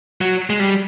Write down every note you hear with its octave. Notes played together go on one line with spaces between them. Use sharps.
F#3
G#3
G3